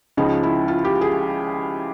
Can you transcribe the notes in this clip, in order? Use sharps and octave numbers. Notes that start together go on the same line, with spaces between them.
C#2 C#3 F3 D#4
E4
F4
G4
G#4